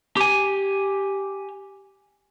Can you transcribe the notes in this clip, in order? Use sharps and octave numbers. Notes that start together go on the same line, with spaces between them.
G4 G#5